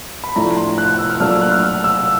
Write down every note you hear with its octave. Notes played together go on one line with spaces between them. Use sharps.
B5
A2 F3 A3 D4 A#5
C6
F#6
F#6
E6
F6
A#2 F#3 A3 D4 F6
E6
F#6
F6
F6
E6